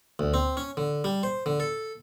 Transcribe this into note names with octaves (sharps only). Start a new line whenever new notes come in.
D2
C4
C#4
D3
G3
C5
D3
A4